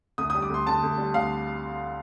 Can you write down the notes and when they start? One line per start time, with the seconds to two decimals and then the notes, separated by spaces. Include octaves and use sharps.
0.18 D2 D#6
0.30 D#6
0.35 G3
0.42 D6
0.49 D2 C6
0.66 D3 A5
0.83 D2
0.98 G3
1.14 D2 F5